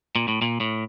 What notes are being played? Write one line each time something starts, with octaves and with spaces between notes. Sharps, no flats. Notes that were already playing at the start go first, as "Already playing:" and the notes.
A#2
A2
A#2
A2